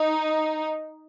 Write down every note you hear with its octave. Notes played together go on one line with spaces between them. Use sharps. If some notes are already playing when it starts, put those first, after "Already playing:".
Already playing: D#4